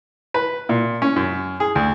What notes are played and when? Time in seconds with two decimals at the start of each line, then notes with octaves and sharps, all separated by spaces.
0.34 B4
0.69 A#2
1.02 C#4
1.16 F#2
1.60 G#4
1.75 D2